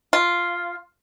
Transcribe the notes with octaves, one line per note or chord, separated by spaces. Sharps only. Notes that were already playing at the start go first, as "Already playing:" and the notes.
F4